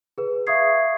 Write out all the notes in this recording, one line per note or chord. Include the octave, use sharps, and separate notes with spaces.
G#4 B4
E5 F5 C#6 D#6 G#6 C7